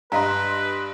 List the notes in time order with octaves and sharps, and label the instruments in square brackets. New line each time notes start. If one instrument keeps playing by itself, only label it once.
[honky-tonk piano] G2 D#5 C6 [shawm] B4 [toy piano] F5 A5 A#5